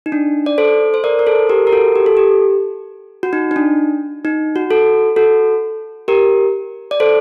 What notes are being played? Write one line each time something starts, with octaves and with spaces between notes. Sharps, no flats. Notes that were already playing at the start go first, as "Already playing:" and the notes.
D#4
D4
D5
A4 C5
C5
A#4 D5
A#4
A4 C5
G4 A#4
A#4
F#4 A4
G4
A4
G4
F#4
D#4
D#4
D4
D#4
F#4
F#4 A4
F#4 A4
G4 A#4
D5
A4 C5